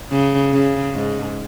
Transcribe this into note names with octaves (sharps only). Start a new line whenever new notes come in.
C#3
C#3
G#2